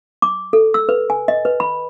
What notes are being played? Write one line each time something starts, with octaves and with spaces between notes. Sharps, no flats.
D6
A4
E6
B4
G#5
D#5
B4
B5